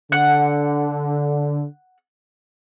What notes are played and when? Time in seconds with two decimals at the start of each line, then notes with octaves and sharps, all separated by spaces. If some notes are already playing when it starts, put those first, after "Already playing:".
0.12 D3 F#5